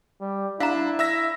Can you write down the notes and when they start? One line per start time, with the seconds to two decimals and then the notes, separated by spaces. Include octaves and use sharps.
0.21 G3
0.60 D4 E4 F5 A#5
0.99 E5 E6 A#6